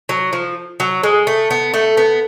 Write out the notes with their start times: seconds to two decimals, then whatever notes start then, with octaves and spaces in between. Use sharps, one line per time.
0.09 F#3
0.33 F3
0.80 F#3
1.03 G#3
1.27 A3
1.51 B3
1.74 A3
1.97 B3